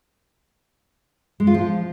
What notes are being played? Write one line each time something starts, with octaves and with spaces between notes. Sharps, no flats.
G#3
F4
F3